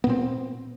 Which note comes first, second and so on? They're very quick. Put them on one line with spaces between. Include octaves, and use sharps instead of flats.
B3 A#2 C4